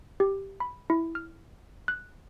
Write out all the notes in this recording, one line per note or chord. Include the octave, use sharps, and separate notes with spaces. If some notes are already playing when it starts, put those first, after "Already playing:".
G4
B5
E4
F6
F#6